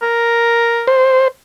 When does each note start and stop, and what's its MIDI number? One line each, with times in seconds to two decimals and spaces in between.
0.02 0.89 70
0.87 1.28 72